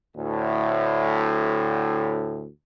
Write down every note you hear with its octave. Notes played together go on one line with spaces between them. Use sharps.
D2 A2